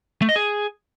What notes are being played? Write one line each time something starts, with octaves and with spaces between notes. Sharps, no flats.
A3
D#5
G#4